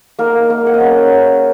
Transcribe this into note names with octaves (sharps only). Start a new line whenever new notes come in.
A#3 D#4 A#4
D#4
A#3 A#4
G#3
F#5
D#5
G#3 C#4 C#5
D#4
D#4